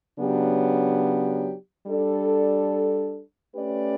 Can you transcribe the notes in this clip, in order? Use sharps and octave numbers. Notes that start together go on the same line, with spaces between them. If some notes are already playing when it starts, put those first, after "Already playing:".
C#3 F#3 B3 D4 G4
G3 D4 A4 D5
A3 C#4 G4 B4 D5